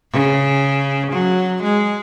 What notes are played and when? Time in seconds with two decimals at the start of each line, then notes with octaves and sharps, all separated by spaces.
0.12 C#3
1.12 F#3
1.63 G#3